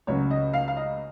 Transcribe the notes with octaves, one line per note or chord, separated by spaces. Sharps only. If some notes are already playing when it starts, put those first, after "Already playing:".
C#2 C#3 F#3 C#5
D#5
F5
F5
D#5